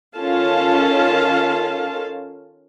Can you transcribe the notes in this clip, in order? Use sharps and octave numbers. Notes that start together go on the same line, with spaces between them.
D#3 C#4 F4 A4 F5 A5